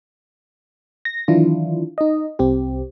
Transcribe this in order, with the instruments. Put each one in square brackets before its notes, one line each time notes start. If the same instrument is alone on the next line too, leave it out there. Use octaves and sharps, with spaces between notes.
[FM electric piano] A#6
D#3 E3 F#3 D4 E4 F4
D#4 D#5
C2 C4 G4